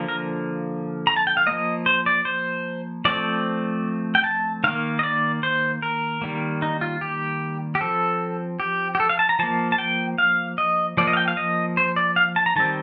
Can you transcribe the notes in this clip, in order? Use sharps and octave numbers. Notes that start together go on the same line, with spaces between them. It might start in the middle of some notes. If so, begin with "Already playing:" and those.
Already playing: D3 F3 A#3
A#4
A#5
A5
G5
F5
F3 A#3 D#5
C5
D5
C5
F3 A3 C4 D5
G5
A5
D#3 A#3 F5
D#5
D5
C5
A#4
D#3 G3 A#3
D#4
F4
G4
G4
F3 C4 A4
G4
G4
A4
F5
A5
A#5
F3 A#3 A5
A5
G5
F5
D#5
F3 A#3 D5
D#5
F5
G5
F5
D#5
C5
D5
F5
A5
A#5
D#3 G3 C4 A5